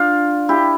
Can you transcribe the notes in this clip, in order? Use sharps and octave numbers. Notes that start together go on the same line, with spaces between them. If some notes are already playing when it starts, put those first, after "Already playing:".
Already playing: D4 F4
E4 G4